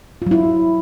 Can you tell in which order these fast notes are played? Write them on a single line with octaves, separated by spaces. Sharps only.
F4 F#3 E4